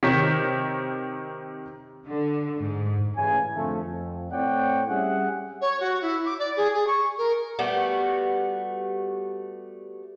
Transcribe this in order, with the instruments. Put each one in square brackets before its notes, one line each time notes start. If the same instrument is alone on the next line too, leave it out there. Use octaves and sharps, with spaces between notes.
[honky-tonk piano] C3 D#3 C#5 B6
[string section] D3
G#2
[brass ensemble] A1 C#3 G#5
F2 D3 F3 A3
F2
A2 C4 C#5 D5 F#5 G5
G3 C#4 G#4 E5 F#5
[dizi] C#5
F#4
E4
D6
D5
G#4
G#4
C#6
A#4
[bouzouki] G3 A3 B3 F#4